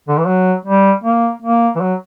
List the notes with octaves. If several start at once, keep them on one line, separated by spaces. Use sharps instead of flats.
D3
E3
F#3
G3
A#3
A#3
E3
F#3